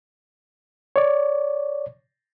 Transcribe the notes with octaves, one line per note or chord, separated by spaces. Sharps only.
C#5 D5